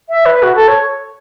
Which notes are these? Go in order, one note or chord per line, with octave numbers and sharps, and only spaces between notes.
E5
B4
F#4
A4
C#5